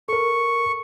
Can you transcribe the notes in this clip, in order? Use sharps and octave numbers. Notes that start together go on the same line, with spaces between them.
A4 A#4 C#6